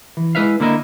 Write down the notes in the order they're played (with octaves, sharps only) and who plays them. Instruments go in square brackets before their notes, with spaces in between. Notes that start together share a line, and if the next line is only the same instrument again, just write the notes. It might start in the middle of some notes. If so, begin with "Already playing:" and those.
[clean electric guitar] E3
G#3 E4 B4 E5 F5
D3 A#3 E4 D#5